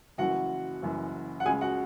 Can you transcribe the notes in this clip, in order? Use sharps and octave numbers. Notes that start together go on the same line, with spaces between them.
F#1 F#2 E3 F#4 F#5
F#1 F#2 E3
F#5
C#2 C#3 G#3 G#4 G#5
F#4 F#5